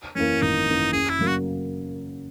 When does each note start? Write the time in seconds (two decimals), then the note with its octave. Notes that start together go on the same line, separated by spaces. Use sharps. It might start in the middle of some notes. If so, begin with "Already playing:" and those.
0.15 F#2 E3 A#3 C#4
0.42 G#1 D#4
0.67 F#2 E3 A#3
0.93 F#2 G#4
1.10 E4
1.19 C#3 F#3 A#3
1.27 F#4